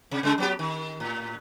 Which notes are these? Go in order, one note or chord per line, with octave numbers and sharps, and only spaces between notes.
C3
C#3 G#3 A4
F#3 B3 G4
D#3
A2